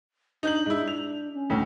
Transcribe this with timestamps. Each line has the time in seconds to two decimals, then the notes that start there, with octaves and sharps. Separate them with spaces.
0.43 D4 D#4 G6 F#7
0.66 G#2 D4 E4
0.88 F7
1.34 C#4
1.50 D2 A2